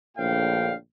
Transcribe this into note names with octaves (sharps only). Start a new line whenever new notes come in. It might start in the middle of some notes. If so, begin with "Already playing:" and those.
A#1 A2 D3 F5 G5